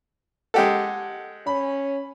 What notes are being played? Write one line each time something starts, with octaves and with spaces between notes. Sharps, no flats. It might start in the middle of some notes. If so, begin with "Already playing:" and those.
G#3 G4 A4 D#5 F#5
C#4 B5